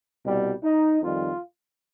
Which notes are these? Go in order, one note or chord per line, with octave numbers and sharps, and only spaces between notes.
C2 B2 G3
D#4
F2 D#3 G3 F4